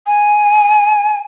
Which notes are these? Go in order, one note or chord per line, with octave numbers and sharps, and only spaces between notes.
G#5